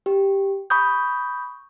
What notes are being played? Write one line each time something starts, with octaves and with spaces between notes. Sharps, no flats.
G4
B5 C#6 D#6 G6